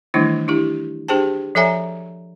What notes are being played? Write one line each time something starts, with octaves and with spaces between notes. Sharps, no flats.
D#3 E3 G3 A3 D4 E4
D4 E4 G4
D4 G4 G#4 C5 G5 A5
F3 A4 C#5 E5 G#5 A#5